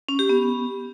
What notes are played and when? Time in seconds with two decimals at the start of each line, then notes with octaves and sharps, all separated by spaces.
0.09 C#4
0.19 G4
0.29 B3